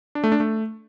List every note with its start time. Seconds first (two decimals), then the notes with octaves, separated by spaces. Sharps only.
0.15 D4
0.24 A3
0.32 D4
0.40 A3